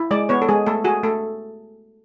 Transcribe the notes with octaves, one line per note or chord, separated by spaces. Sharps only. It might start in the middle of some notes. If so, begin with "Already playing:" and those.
Already playing: E4
G#3 D5
B3 C#5
A4
G#3 G#4
A3 A4
F#4 G#4
A3 A4